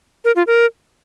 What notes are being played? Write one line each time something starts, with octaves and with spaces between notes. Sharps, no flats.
A#4
F4
A#4